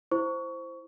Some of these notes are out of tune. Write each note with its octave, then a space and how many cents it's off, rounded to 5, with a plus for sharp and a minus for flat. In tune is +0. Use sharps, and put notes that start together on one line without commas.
E4 +10 C5 +0 C#6 +20